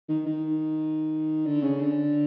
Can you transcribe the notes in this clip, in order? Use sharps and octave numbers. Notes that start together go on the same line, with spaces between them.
D#3
D#3
D3
C#3
D3